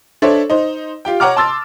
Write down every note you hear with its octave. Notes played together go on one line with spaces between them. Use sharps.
D4 A4 C5 C#5 E5
D#4 C5
F4 G4 G5
C#5 F#5 A#5 D6 F6
A5 C6 E6 A6